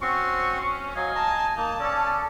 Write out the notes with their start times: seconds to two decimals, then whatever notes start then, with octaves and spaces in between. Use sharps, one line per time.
0.02 C4 C#4 F#4 C6 C#6
0.96 F#3 D#5 F5 G#5
1.15 A5 A#5
1.56 A#3 D#4 A5
1.80 C#4 A4 D5